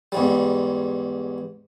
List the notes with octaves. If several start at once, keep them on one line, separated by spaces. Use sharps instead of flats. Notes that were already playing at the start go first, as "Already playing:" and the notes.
E2 G#2 G3